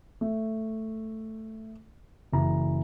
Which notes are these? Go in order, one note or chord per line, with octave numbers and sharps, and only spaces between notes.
A3
F#1 E3 A#5